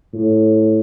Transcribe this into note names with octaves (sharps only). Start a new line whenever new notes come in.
A2